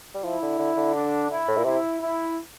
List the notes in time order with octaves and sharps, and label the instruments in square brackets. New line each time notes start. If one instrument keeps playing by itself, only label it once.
[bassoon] G3
[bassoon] F3 [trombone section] E4
[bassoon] D3
D3
D3
[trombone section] D4
E4
[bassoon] A2
A#2
[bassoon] C3 [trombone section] E4
[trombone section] E4